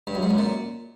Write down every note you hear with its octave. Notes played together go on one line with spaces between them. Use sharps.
G2
F#2
G#2
F#2
A#2